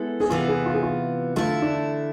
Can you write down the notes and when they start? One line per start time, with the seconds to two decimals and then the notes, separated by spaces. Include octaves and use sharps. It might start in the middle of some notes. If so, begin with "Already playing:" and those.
Already playing: G#3 B3 E4 A4
0.20 G#4
0.30 C3 E3 B3 F4
0.48 G#4
0.66 F4
0.74 G#4
0.83 F4
1.36 D3 A3 E4 F4
1.62 D4